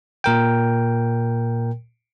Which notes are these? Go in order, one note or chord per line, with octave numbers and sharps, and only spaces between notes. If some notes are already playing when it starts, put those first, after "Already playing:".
A#2 A#4 G5